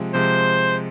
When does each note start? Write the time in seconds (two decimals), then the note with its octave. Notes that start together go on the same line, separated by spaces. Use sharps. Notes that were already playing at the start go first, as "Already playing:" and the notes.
Already playing: C3 F3 G#3
0.14 C3 F3 G#3 C5